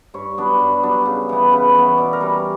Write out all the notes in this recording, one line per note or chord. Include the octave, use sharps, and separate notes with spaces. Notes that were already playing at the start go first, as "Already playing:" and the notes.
G2 C#5
F#3 B3 D4
G2
F#3 B3 D4
C#3
E3 B3
C#3 B4
E3 B3 C#5
B2 D5
A#4
G3 C#4